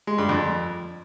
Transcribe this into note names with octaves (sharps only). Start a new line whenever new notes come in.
G#3
G2
F2